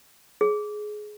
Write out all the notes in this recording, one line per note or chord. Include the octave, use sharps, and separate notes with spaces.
G#4